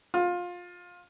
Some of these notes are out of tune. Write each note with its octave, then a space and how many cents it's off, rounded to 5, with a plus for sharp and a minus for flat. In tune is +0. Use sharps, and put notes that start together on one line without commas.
F4 +20